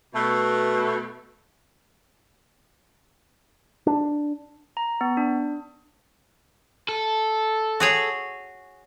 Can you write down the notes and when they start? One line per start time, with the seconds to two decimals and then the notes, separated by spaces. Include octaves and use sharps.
0.15 B2 A3
3.87 D4
4.77 A#5
5.01 B3
5.17 D4
6.89 A4
7.80 F#4 G#4 C#5